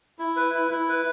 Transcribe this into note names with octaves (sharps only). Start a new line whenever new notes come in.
E4
B4
E4
E4
B4